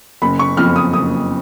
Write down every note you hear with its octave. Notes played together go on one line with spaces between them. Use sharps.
F#1 B5
C#6
F2 F3 F6
D#6
F#1 D#6